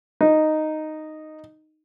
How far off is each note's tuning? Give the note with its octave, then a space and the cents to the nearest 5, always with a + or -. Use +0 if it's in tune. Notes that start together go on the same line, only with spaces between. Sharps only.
D#4 -5